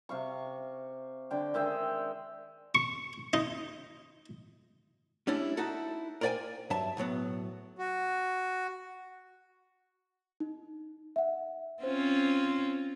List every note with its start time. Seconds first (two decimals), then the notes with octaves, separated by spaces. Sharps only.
0.09 C3 F5 C#6
1.31 D3 G5
1.54 D#3 G#3 E5 G5
2.75 C#6
3.33 D#4
5.27 G3 A3 C#4 D4 E4
5.57 D#4 E4 F#4 A4
6.21 A#4 C5 D5 D#5 G5 G#5
6.70 G2 F#3 E5 A5
6.97 B1 A2 F#3 B3
7.78 F#4
10.40 D#4
11.16 E5 F#5
11.83 C4 C#4 F4 C5